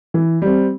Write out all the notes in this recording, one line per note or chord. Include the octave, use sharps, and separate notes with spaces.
E3
G3 C4